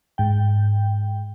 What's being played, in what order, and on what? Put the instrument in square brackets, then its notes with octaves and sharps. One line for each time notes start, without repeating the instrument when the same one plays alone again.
[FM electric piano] G#2 G5